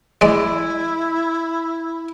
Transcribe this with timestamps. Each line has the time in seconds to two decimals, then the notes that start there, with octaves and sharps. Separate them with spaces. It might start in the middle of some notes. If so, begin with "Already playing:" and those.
0.21 G#3 E4 D5